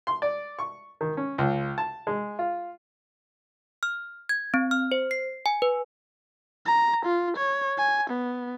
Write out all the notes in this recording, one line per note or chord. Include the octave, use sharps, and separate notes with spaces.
C6
D5
C#6
D#3
C#4
C#2
A5
G#3
F4
F6
G#6
C4
F6
C5
C7
G#5
B4
A#5
F4
C#5
G#5
B3